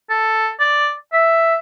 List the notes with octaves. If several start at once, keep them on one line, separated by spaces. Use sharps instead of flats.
A4
D5
E5